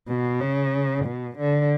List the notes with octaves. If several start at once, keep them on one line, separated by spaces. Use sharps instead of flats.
B2
C#3
B2
D3